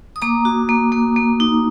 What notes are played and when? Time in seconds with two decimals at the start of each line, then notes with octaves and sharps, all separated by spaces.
0.16 D#6
0.22 A#3 A#5 D6
0.45 F#4
0.69 A#3
0.92 A#3
1.16 A#3
1.40 D#4